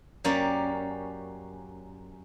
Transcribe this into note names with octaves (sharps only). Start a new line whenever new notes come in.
F#2 A#3 C#4 G4 D5